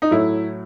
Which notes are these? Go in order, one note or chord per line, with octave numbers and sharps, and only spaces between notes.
D#4
A2 F#3 A3 E4